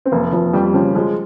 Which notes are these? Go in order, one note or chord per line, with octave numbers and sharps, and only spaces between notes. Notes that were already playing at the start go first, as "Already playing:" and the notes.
C4
F1 A#3
F1 F3
F2 G3
C#3 F3
F3 G#3